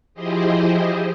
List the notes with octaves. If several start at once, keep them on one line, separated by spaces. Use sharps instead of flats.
F3 E4 G4 G#4 C5 D#5